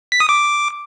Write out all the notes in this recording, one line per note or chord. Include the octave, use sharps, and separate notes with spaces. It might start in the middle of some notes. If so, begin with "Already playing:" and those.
B6
D#6
D6